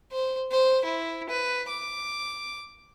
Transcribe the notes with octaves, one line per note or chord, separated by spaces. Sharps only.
C5
C5
E4
B4
D6